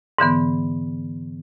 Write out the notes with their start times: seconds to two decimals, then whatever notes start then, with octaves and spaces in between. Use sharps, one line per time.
0.18 G#2 D3 E3 B3